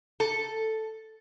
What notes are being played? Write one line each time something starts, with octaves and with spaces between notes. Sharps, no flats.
A4